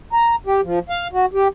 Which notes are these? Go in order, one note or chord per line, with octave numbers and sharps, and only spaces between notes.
A#5
G4
F3
F5
F#4
G4